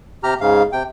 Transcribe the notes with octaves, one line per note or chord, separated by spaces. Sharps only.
C3 G4 A#5 F6
G#2 C#3 F5
C3 G5